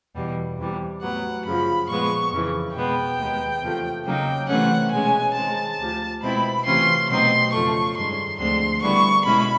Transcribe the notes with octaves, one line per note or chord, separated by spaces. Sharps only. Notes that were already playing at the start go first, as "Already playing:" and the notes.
E2 B2 G3
E2 C3 E3 G3
A2 F#3 B3 F#5
F#2 C#3 F3 B5
A#2 F3 G#3 B3 C#6
F2 C#3 E3
B2 G#3 B3 G5
D#2 D#3 G#3 B3
E2 C3 F3 A3
C#3 F#3 A#3 D#4 G5
C3 E3 A3 C#4 F#5
B2 G#3 C#4 G#5
D#3 G#3 C4 A5
D2 C3 F3
B2 G#3 C4 E4 B5
C3 E3 A3 C#4 F4 C6
B2 F#3 A3 C4 D#4 C6
F2 C#3 F3 A3 C#6
G2 D#3 G#3 C#4 C6
D2 D3 F3 G#3 C4 C6
D3 G3 B3 E4 C#6
B2 G#3 C#4 E4 B5